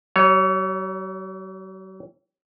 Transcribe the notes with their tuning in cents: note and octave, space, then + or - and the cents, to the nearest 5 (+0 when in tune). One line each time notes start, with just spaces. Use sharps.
F#3 +45 C#5 +0